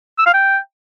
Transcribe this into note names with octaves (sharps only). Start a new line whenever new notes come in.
E6
F5
G5